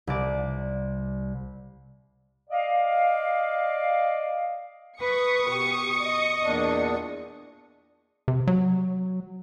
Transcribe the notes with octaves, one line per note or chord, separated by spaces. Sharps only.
C2 D5
D5 D#5 F5
B4 C#6 D#6 C#7
B2 G4
D#5
E2 A#2 D4
C3
F#3